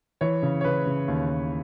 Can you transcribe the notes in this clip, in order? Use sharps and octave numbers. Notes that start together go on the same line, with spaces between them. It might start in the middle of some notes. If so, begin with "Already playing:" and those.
E3 C#5
C#3
C#5
C#3 B4
C#3
D#2
D#2